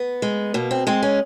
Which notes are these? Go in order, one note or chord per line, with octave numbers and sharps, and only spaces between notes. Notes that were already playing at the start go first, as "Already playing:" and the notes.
Already playing: B3
G#3
B2 A#3
C4
G#3 C4
C#4